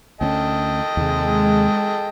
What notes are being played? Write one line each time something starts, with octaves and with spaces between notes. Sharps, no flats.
D2 C4 C#4 A4 D#5 G5
D#2 C3 G#3